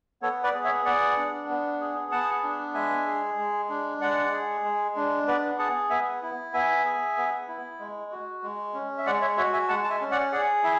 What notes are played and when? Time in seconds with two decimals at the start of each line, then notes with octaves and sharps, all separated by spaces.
0.22 B3 A4 C#5
0.43 B4 D5
0.54 G#4
0.64 C#5 E5
0.85 B3 D5 F#5
1.17 D4
1.49 B3
1.80 G#4
2.12 B3 F#5 A5
2.43 D4
2.74 G#3 E5 G#5
3.06 G#4
3.38 G#3
3.69 D4
4.01 G#3 D5 F#5
4.32 G#4
4.64 G#3
4.96 D4
5.27 B3 B4 D5
5.59 G#4 F#5 A5
5.90 B3 E5 G#5
6.22 E4
6.53 B3 E5 G#5
6.85 G#4
7.17 B3
7.48 E4
7.80 G#3
8.12 F#4
8.43 G#3
8.74 C#4
8.98 E5
9.06 G#3 D5 F#5
9.21 C#5 E5
9.37 F#4 C#5 E5
9.53 E5 G#5
9.69 G#3 F#5 A5
9.84 A5
9.90 E5 G#5
10.01 C#4
10.11 D5 F#5
10.32 G#4 D5 F#5
10.63 E4 E5 G#5